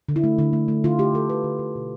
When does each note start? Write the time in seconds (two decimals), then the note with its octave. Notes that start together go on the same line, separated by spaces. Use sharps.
0.08 D3
0.16 E4
0.24 A3
0.39 D3
0.53 A3
0.68 A3
0.84 D3 F4
0.98 A3 G4
1.14 D3 A4
1.30 D3 B4
1.44 D3
1.59 D3
1.75 B2